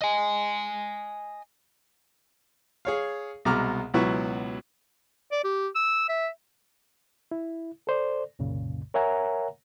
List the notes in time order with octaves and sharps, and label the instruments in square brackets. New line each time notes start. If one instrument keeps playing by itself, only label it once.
[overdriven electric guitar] D#5 G#5
[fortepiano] G#4 C#5 F5
C2 B2 G#3 A#5 D6 F6
C#2 B2 F#3 E4 B4 C#6
[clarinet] D5
G4
E6
E5
[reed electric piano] E4
A4 C5 D5
C2 F#2 A#2 C#3
A#4 C#5 E5 F#5 G#5 A#5